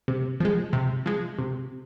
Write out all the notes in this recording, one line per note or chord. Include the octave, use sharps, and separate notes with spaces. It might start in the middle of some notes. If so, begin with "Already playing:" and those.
C3
F3 G#3
C3
F3 G#3
C3